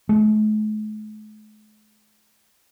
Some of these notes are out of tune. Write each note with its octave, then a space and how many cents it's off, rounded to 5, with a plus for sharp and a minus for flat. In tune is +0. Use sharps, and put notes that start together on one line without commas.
A3 -45